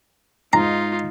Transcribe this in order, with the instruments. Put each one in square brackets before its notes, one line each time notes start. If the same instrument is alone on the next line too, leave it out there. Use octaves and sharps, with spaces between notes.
[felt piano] G#2 [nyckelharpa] D#4 F4 [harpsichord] A#5